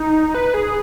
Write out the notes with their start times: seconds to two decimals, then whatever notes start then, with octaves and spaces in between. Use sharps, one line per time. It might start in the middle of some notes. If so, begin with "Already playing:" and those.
Already playing: D#4
0.34 B4
0.54 G#4